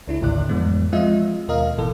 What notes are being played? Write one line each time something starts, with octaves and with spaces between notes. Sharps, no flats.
C#2 D4 E4
A1 D#2 A2 D3 D5 F#6
F2 E3 F#3 G#3 B3
F3 G#3 C4 F4 D#5 E5
D#2 B2 A#4 D#5 F5
G#1 B2 E3 A4